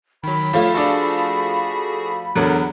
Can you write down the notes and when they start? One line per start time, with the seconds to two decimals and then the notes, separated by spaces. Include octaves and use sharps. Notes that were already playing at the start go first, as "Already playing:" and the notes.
0.23 D#3 F#3 B5
0.53 F3 A3 F4 C#5
0.74 D4 F#4 G#4 A4
2.36 E2 D3 F#3 A#4 F#5 F#6